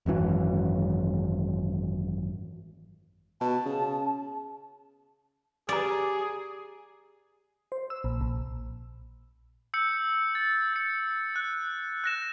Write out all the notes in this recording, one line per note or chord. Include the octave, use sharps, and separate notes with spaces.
G#1 F#2 E3 F#3
B2 A5
C#3
G4 G#4 D5 A#5 D6
C5
E6
A#1
A#1
E6 G6 C#7
A6
A6 C#7
F#6
F#6 A#6 E7